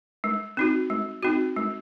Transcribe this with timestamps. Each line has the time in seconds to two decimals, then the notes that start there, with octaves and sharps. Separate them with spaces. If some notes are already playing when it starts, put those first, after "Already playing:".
0.24 G#3
0.57 C4 D#4 F#4
0.90 G#3
1.23 C4 D#4 F#4
1.56 G#3